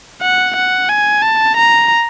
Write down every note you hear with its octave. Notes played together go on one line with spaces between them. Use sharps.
F#5
F#5
G#5
A5
A#5